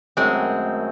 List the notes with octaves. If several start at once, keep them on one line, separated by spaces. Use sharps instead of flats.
F#2 D#3 G#3 A3 C4